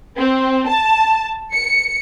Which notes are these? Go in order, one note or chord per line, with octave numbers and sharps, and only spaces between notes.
C4
A5
C#7